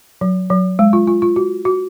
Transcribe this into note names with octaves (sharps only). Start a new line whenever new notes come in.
F#3
F#3
G#3
F4
F4
F4
F#4
F#4